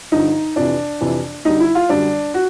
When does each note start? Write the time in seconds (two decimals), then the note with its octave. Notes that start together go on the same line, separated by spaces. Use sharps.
0.12 G2 D3 F3 D#4
0.56 F2 C3 E3 D4
1.01 F2 C3 E3
1.45 F#2 D3 G3 D#4
1.60 E4
1.75 F4
1.89 F#2 D3 G3 D4
2.34 F#4